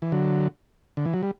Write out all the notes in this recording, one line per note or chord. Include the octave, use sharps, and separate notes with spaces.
E3
D3 F#3
D3
E3
F#3
G3